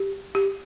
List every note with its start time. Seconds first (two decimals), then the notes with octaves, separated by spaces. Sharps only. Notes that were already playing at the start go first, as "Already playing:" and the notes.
Already playing: G4
0.35 G4